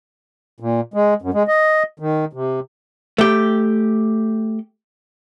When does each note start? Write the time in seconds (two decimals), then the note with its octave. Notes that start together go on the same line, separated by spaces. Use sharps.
0.60 A#2
0.94 G#3
1.22 F#2
1.34 G#3
1.48 D#5
2.00 D#3
2.33 C3
3.18 A3 G4